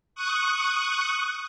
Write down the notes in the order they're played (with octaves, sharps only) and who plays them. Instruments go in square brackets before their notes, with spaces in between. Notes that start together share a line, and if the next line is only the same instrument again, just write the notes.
[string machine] C#6 D#6 F#6